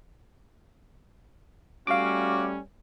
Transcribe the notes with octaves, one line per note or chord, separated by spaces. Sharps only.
G3 A3 C#4 F#4 F5 D6